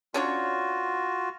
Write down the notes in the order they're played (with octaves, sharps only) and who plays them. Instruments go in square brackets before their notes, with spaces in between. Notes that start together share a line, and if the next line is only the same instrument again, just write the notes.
[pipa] C#4 D4 C#5 [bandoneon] F4 F#4